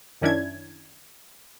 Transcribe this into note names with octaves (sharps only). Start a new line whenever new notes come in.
F#2 D#3 C#4 D4 E4 G#6